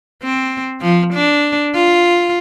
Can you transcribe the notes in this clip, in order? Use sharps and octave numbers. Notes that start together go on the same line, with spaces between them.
C4
F3
D4
F4